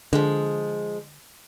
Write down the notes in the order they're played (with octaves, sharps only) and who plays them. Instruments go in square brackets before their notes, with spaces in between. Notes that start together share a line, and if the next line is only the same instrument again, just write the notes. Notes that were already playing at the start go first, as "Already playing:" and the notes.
[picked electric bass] D3 [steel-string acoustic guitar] F3 G#3